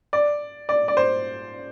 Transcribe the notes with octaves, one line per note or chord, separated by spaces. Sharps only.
D5
D5
D5
C5